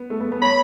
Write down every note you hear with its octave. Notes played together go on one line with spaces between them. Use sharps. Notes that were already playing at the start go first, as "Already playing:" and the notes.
Already playing: B3
A3
B3
B3
C#5 B5